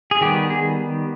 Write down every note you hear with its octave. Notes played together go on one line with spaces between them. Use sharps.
G#4
D#3 G3 B3 G4
G#4